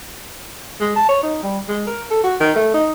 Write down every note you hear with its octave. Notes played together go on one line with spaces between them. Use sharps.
G#3
A5
C#5
D#4
G3
G#3
A#4
A4
F#4
D#3
A3
D#4